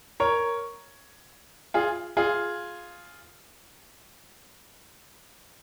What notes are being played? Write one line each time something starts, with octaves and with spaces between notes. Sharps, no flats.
A#4 C#5
F4 G#4
F4 G#4